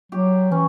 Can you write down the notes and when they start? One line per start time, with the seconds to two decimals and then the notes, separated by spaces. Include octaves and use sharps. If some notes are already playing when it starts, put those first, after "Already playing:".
0.12 F#3 G4
0.51 E3 C#4